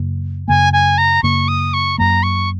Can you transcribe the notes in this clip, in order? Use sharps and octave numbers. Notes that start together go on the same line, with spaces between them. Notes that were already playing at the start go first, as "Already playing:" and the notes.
Already playing: F#2 C#3 A#3
F#2 C#3 A#3 G#5
G#5
A#5
F#2 C#3 A#3 C#6
D#6
C#6
F#2 F#3 A#3 A#5
C#6